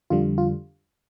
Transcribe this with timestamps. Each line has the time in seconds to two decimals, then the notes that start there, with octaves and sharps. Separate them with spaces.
0.10 F2 D3 G3 F4
0.38 F4